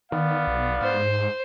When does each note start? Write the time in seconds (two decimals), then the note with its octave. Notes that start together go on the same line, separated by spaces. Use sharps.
0.12 D#3 B3 D5 F5
0.47 B1
0.81 G#2 C5